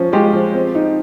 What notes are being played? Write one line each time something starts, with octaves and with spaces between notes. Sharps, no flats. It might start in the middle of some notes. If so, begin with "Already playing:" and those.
Already playing: F3 C#4
G#3 F4 G4
F3
C4
D#4